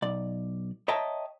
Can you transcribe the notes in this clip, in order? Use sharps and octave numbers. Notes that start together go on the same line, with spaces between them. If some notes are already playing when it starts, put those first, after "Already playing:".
B1 D5
C#5 D#5 E5 G5 A5 A#5